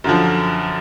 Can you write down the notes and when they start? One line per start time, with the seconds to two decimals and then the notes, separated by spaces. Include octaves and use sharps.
0.04 F#2 D3 F3